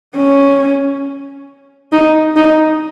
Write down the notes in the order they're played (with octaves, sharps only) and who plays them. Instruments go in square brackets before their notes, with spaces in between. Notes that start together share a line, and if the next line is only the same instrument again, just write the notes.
[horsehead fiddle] C#4
D#4
D#4